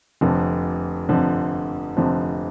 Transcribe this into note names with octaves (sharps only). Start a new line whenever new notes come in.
F1 F2 D3 F3
F1 F2 D3 F3
F1 F2 D3 F3